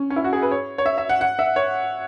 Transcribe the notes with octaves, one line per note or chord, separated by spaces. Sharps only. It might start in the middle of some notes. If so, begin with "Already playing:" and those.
Already playing: C#4
C#4
E4
F#4
G#4
B4
C#5
C#5
E5
E5
F#5
F#5
E5
C#5